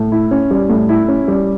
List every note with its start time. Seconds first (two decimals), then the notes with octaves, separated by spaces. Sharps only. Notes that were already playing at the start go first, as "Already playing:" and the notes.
Already playing: A2
0.12 E4
0.31 C#4
0.51 G3
0.69 A2
0.89 E4
1.08 C#4
1.28 G3